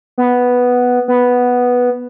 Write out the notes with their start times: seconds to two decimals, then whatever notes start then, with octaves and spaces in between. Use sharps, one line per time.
0.18 B3
1.08 B3